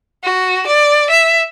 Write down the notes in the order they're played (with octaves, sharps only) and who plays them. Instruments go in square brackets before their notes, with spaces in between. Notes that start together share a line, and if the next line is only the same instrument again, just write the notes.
[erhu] F#4
D5
E5